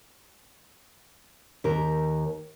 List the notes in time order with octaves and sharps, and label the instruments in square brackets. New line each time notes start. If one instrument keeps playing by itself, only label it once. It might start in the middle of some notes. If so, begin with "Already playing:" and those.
[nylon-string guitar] D#2 A#4